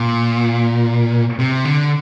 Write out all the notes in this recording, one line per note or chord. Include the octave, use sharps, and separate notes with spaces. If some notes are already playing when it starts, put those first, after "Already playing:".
Already playing: A#2
C3
D3